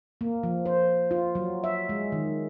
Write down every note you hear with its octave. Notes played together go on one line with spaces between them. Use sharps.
A#3
F3
C5
F4
F#3
E5
G#3
D#3